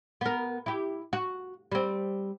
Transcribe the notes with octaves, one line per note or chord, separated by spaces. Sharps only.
B3 A#4
E4 G4
F#4
G3 C4